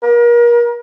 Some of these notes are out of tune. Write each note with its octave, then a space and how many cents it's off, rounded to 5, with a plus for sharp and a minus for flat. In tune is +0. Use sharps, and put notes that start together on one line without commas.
A#4 +35